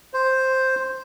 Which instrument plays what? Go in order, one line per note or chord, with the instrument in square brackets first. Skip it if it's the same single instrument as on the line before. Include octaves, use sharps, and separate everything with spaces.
[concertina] C5